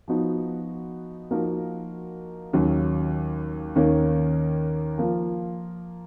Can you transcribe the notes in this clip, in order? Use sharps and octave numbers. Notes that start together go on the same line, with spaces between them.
F3 B3 D#4 F#4
F3 A#3 D#4 F#4 A#4
D#2 C#3 F#3
D#2 D#3 A#3 C#4
F3 A#3 F4